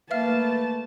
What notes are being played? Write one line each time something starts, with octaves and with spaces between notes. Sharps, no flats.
A3 A#3 B4 E5 F5 A5 F6